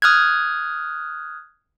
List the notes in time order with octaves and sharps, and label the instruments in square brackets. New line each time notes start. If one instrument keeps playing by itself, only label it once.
[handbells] D#6 F6 F#6 G#6